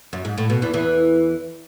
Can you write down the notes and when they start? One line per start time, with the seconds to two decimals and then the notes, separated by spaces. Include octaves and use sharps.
0.13 F#2
0.25 G#2
0.38 A2
0.50 B2
0.62 E2 E3
0.73 E2 E3